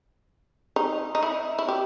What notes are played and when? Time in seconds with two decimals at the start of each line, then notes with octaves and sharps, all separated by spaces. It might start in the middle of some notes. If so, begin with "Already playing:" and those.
0.76 D#4
1.15 D#4
1.23 E4
1.59 E4
1.69 G4